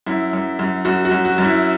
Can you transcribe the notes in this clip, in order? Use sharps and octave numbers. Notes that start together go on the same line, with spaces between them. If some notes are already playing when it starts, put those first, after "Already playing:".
F#2 E4
F#2
F#2
F#2 F#4
F#4
F#2
F#4
F#2
E4